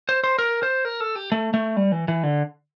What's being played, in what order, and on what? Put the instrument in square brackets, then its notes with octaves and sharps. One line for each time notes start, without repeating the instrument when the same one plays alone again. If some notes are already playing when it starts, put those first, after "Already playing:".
[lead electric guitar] C5
C5
A#4
C5
A#4
A4
G4
A3
A3
G3
E3
E3
D3